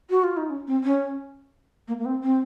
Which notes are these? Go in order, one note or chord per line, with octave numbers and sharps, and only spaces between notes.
F#4
F4
D#4
C#4
C4
C#4
A#3
A#3
C4
C4